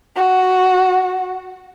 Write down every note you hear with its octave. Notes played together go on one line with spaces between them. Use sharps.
F#4